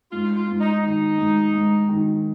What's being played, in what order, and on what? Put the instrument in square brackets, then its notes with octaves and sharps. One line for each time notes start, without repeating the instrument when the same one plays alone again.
[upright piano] G#2 [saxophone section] F4
[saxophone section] F4
[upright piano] G#2
[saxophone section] D#4
[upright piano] D#3 [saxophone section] D#4
[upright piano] G#2
G#2
D#3